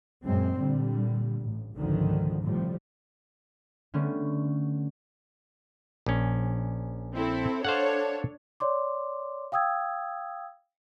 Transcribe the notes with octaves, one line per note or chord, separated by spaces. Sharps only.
F#2 A#2 G#3 C4
A#2 D3 G3
A1
G#1 C#2 B2 D3 D#3 F3
A2 C3 F3 G3
D3 G3 A3 B3 C#4 D4
A#1 C#4
C4 E4 A4
D4 A4 C5 C#5 F5 F#5
C#5 D5 C6 D6
F5 G5 D#6 E6 G#6